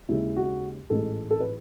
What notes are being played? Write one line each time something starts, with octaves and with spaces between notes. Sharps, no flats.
D#2 C#3 G#3 E4
F#4
A1 G#2 E3 G#3 A4
A4
B4